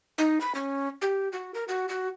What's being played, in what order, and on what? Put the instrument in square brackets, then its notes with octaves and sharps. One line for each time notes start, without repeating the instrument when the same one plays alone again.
[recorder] D#4
B5
C#4
G4
F#4
A#4
F#4
F#4